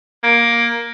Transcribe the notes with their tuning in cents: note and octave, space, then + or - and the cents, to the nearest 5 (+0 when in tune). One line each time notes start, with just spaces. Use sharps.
A#3 +10